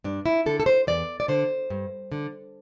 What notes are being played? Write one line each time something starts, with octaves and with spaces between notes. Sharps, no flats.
G2 D4
E4
D3 A4
A4
C5
E2 D5
D5
D3 C5
G2
D3